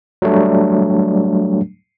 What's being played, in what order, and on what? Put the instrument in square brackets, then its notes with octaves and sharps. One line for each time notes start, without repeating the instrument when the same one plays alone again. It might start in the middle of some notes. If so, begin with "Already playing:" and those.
[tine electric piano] F#3 G3 A3 D4